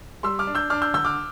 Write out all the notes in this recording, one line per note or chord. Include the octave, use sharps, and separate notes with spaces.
G3 C6 E6
D6 F6
D4
E6 G6
D4 D6 F6
E6 G6
D3 E6 G6
D6 F6